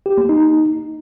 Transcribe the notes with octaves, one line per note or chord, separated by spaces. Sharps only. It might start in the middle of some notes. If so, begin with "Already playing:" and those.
G4
A#3
D#4